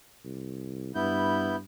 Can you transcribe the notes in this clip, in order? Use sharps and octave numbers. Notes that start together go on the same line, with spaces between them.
C2
G2 B3 E4 G6